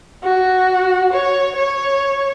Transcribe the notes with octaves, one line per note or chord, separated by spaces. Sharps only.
F#4
C#5
C#5